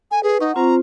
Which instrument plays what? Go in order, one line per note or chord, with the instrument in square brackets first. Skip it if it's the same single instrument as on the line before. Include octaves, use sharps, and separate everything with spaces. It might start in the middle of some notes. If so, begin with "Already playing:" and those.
[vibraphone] A4 [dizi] G#5
[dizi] G#4 [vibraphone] B4
[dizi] D#4 [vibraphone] F#5 C#6
[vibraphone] C4 F4 C5 [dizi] A#5